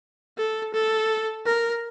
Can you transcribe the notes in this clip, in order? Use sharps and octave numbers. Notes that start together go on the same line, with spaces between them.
A4
A4
A#4